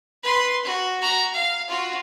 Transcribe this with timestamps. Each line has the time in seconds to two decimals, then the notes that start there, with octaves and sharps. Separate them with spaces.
0.23 B4 C6
0.64 F#4
1.00 F#4 A#5
1.34 F5
1.68 F4 F#4